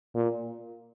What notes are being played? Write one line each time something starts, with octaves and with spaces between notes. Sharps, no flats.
A#2